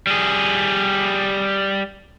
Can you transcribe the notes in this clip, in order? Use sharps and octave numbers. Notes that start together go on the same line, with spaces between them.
G3 G#4